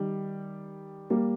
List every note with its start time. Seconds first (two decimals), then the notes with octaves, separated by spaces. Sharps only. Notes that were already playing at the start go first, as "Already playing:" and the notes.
Already playing: D#3 G3
1.10 G3 A#3